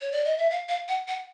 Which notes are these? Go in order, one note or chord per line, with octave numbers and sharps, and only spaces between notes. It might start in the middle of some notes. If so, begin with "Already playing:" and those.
C#5
D5
D#5
E5
F5
F5
F#5
F#5